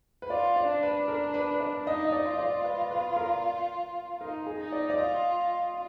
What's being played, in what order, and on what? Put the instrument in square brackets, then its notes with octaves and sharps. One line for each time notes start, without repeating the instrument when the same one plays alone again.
[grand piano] B4
[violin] F4 [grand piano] D5
[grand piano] D5
[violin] D4
[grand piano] B4
A#4
B4
B4
D5
[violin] D#4 [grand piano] D#5
[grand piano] D#5
D5
[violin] F4
[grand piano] D#5
D5
B4
B4
A#4
[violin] D#4 [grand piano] A#4
[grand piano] G#4
[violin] D#4
[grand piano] D5
D5
[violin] F4 [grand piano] D#5